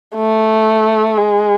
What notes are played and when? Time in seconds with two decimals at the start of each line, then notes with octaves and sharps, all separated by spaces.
0.16 A3
1.17 G#3